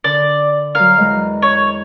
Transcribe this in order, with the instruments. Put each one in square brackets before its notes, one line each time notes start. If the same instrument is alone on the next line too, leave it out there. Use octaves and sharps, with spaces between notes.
[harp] D3 [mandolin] D5
[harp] F#3 A#4 [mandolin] F5
[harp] E2 G#3 D#5
[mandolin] C#5